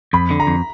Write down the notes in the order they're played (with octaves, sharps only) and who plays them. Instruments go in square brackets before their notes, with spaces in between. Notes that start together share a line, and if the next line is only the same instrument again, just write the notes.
[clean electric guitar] F2 [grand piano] B5
[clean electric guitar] D3
[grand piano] A#5
[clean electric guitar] F2